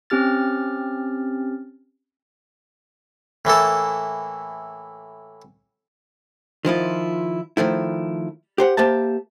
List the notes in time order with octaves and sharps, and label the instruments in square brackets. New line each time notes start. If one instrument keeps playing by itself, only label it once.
[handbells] C4 C#4 G4 F6 A6
[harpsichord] A2 E3 A#3 A4
[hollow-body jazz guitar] D#3 F3 E4 F4
D#3 F3 A3 E4
G4 C5 F#5
A#3 G4 C5 E5 A5